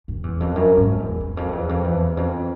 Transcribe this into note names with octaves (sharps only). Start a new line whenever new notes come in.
F2
E2
F2
F#2
G#2
E2
E2
F2
E2
F2
E2
F2